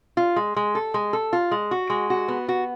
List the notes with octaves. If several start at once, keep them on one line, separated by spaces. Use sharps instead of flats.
F4
G#3
G#3
A4
G#3
A4
F4
G#3
F#4
G#3
F#4
B3
F#4